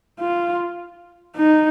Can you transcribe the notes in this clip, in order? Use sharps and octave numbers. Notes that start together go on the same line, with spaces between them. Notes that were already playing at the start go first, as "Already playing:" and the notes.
F4
D#4